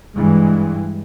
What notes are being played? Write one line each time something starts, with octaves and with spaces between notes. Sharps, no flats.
G2 E3 G#3